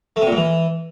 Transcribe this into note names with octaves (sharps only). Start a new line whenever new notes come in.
A3
C3
A#2
G#2
E3